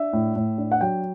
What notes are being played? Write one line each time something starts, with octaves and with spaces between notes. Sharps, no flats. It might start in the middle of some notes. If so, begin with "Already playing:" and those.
Already playing: D4 E5
A2
A2
D4
F#5
F#3 G5